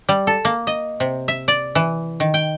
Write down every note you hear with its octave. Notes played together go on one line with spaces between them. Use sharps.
G3
A4
A#3
D#5
C3
E5
D5
E3
D#3
G5